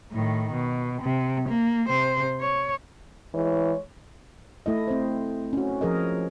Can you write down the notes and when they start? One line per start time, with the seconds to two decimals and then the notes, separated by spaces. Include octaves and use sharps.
0.12 A2 D#3
0.53 B2
1.02 C3
1.49 A#3
1.87 C3 C5
2.40 C#5
3.34 E3 G#3 C#5
4.66 A3 E4 D#5
4.88 C4 C5
5.53 C#4 F#4
5.81 F3 G#4 A#4 D#5